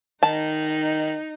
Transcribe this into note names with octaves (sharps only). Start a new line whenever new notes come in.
D#3 D#4 A5